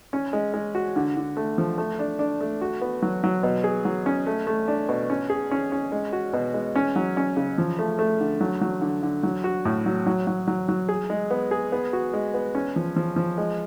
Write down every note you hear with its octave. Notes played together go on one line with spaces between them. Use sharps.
C#4
G#3
G#3
F#4
D3
D3
A3
F3
A3
D4
D4
A3
F#4
B3
F#3
F#3
B2
G#4
F#3
C#4
A3
A3
D4
B2
C#4
G#4
C#4
C#4
G#3
F#4
B2
G#3
C#4
F#3
C#4
C#3
F3
A3
A3
D3
F#3
F#3
D3
D3
F#3
F#4
A2
F#3
F#3
F#3
F#3
F#3
G#4
G#3
B3
G#4
B3
F#4
G#3
B3
C#4
F3
F3
F3
G#3